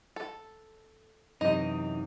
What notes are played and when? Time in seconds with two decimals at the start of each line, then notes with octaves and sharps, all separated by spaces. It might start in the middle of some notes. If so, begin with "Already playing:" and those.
0.16 A4
1.41 F#2 C3 E3 D#4 D#5